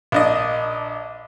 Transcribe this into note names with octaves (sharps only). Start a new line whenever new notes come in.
A#1 D4 D#5